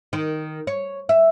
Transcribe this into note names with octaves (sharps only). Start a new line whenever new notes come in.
D#3
C#5
E5